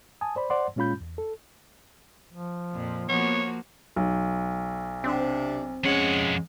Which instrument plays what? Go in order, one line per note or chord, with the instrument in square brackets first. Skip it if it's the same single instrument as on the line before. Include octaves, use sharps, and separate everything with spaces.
[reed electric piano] G#5 A5 D#6
C5 D5 B5
C5 D5 F#5 C6
A#2 G#3 C#4 F4 B5 G6
E2
A4
[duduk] F3
[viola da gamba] F2 A#2
[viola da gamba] F3 A#3 F#4 [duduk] B3 [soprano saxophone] C#5
[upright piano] B1
[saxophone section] C3 D4 [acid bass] C4
[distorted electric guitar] F2 F#5 [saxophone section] G#3 C#4